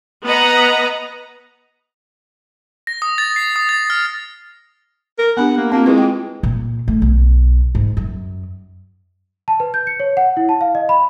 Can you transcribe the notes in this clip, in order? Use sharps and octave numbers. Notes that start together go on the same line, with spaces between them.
B3 B4 D#5 F#5 A#5
A#6
D#6
A6
C7
D#6
A6
F6
A#4
B3 D4 G4 F#5
A#3
A#3 C4 F4
G#3 E4 F4 B4
F4 G5
A#2
A3
B1
G#2
F#2
A5
B4
G6
C#7
C#5
F#5
E4
A5
F5
D#5
B5